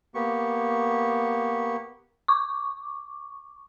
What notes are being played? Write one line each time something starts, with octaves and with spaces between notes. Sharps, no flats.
A#3 B3 G4 C#6
C#6 D6